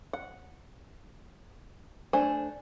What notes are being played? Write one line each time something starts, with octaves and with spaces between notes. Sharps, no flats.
F#5
A3 D4 C5 G#5